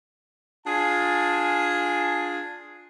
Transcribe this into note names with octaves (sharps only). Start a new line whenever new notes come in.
D4 F4 G#4 G#5 A5